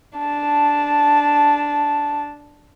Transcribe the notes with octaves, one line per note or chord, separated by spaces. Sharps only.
D4 A5